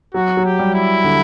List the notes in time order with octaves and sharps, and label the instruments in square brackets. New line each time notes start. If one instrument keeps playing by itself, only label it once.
[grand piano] F#3 [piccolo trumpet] F#4
[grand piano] F#3
[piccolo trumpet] G4
[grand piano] G3
[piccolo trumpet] E4
[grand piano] D3